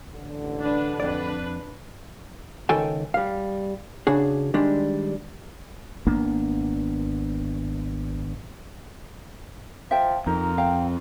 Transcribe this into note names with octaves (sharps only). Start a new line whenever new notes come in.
A1 D3
D4 B4
F2 D4 B4 D5
C#2 D#3 A4 G5 G#5
G3 F5
C#3 D4 F#4 G#4
D#3 G3 G#3 D4
G#1 A#3 B3 D4
F3 E5 G5
F2 D#4 F4 A#4
F5 G5